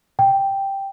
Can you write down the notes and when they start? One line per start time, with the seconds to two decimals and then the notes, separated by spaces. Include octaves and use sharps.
0.19 G5